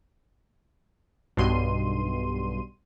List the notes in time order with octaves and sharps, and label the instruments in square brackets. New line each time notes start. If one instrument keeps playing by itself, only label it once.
[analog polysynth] B1 G2 B2 C6 D#7